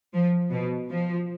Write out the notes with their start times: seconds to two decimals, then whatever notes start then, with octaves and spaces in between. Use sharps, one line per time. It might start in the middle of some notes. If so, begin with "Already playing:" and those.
0.13 F3
0.51 B2
0.89 F3